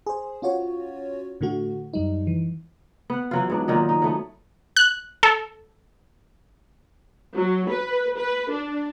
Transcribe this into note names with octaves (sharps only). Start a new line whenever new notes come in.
G#4 C5
C#4 F4 F#4 C#5
A2 D3 A3 F#4
F#2 G3 D#4
E3
B3 F#5
E3 F#3 F4
G#2 F#3 B3 D4
A#2 D#3 F#3 D#4
D#4
F#3 A3 B3
F#6
A4
F#3
B4
B4
D4